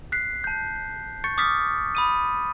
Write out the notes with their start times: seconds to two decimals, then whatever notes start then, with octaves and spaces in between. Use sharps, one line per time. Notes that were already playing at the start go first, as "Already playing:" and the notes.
0.12 F#6 B6 C7
0.44 A5 G6
1.24 C#6 G6 A6 C#7
1.38 D6 D#6 F6 A6 B6
1.95 B5 D#6 D#7